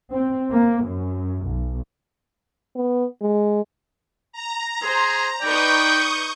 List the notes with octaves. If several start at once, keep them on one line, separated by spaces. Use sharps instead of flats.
C4
A#3
F#2
B1
B3
G#3
A#5
G#4 C5
D#4 B4 D5 G5 C#6 D#6 G6